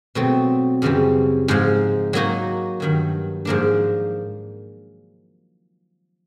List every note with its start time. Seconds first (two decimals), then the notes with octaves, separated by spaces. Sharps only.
0.15 B2 F#3 A3 C4
0.82 F#2 C#3 E3 G3 C4
1.48 G#2 F3 G#3
2.13 F#3 A#3 D#4 F#4
2.80 G2 D#3 F#3
3.45 G#2 F3 A#3 D4